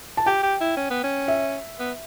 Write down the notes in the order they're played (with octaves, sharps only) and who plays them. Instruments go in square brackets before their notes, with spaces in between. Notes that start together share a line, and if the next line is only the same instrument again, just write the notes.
[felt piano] A5
[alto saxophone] G4 [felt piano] G5
[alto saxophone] G4
E4
C#4
B3
C#4
[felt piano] E5
[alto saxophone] B3